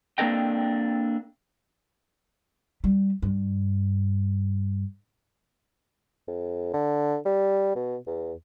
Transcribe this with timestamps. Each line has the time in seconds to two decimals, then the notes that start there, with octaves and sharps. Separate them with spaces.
0.18 A#3 C4 D4 A4 D#5 G5
2.84 G3
3.22 G2
6.28 F2
6.74 D3
7.26 G3
7.76 B2
8.07 E2